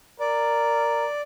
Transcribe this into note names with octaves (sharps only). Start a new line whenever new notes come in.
A#4 D5